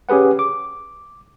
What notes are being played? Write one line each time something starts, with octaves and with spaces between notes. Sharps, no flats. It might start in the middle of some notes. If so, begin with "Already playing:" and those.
C#4 G4 G#4 B4 F#5
D6